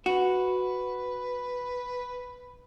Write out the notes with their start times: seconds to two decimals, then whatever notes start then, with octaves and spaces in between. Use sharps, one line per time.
0.06 F#4 B4